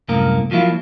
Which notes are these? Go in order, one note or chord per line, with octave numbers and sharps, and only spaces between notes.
C2 F#2 A2 A#3 A#4
F3 F#3 A#3 E4 F4